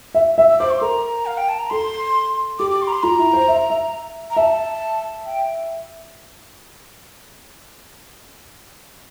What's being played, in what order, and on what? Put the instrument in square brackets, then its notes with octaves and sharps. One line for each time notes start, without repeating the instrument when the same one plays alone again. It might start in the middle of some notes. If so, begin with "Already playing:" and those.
[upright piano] E5
[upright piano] E5 [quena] E6
[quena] E6
[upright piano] C5 [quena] D6
[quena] C6
[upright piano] A#4 [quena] A#5
[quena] F5
G5
A5
A#5
[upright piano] A4 [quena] C6
[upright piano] G4 [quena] D6
[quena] D6
C6
A#5
C6
[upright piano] F4 [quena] A#5
[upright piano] E4
C5
E5
E5
[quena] A#5
[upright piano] E5 [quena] A5
[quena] G5